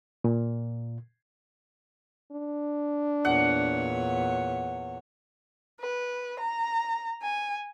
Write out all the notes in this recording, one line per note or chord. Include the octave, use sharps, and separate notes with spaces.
A#2
D4
E2 A#2 C#5 F#5
B4
A#5
G#5